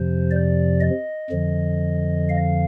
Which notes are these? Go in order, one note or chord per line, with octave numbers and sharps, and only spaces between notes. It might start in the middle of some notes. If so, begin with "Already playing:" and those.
Already playing: F2 C3 F3 C5
D5
D#5
F2 D3 F3
F5